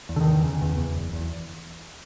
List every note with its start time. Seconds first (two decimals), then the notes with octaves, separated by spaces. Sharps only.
0.09 E2
0.16 D3
0.21 D#3
0.27 E2
0.44 C#3
0.62 E2
0.78 E2
0.95 F#1
1.13 E2